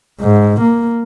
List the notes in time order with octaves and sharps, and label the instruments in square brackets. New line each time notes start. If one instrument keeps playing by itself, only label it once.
[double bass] G#2
A#3